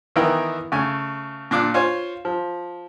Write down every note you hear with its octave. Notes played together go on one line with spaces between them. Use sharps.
D#3 E3 B3 E4 A#4 G5
C#3 A3 G#5
A#2 D4 F4 D6
F4 C5 C#5 G#5
F3